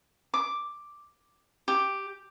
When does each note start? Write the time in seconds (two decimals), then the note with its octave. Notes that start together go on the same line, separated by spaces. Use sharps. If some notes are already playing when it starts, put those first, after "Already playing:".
0.34 D6
1.68 G4